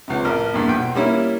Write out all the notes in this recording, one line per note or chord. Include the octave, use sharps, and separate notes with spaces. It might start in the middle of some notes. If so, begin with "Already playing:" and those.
C#2 C3
A1 A#4 F6
E2 G2 A#2
B1 G5
G3 A#3 C#4 E4